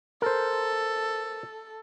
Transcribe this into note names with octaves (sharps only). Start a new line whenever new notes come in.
A4 A#4 C5